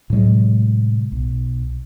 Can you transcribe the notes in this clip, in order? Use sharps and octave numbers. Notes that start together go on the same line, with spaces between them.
A2 C3 F#3 G#3
B1